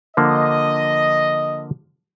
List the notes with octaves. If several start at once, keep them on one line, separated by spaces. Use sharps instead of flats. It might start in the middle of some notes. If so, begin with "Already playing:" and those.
D3 F3 A#3 D#5